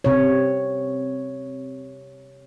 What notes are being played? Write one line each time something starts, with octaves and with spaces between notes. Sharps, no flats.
C3 C#5